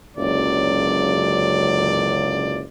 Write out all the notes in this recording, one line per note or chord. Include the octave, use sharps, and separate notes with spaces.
F#1 C#2 D3 F#3 D5